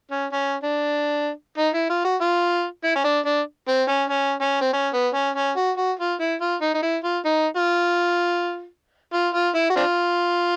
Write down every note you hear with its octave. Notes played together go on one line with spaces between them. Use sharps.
C#4
C#4
D4
D#4
E4
F4
F#4
F4
E4
C#4
D4
D4
C4
C#4
C#4
C#4
C4
C#4
B3
C#4
C#4
F#4
F#4
F4
E4
F4
D#4
D#4
E4
F4
D#4
F4
F4
F4
E4
F#4
C4 D4 F4